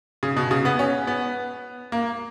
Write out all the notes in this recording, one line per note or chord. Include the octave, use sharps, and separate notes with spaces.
C#3
B2
C#3
B3
C#4
B3
A#3